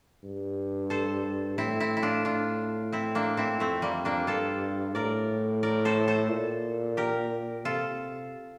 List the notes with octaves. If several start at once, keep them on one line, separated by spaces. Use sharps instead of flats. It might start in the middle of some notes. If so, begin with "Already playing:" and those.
G2
A4 C5
A2 C4 E4
C4 E4
E4
D4 F4
D4 F4
C4 E4
A#3 D4
C4 E4
F2 A3 C4
G3 A#3
A#3 D4
G2 F4 A4
A2 A#4 D5
A#4 D5
A4 C5
A4 C5
A#2
G4 A#4
C3 F4 A4